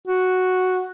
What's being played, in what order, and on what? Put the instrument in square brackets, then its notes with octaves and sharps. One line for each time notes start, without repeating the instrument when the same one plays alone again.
[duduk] F#4